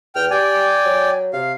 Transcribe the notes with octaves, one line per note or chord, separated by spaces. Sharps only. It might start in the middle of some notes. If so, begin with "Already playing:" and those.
E2 G5 F6
G4 D5 G5 G#5
F#3
C3 F5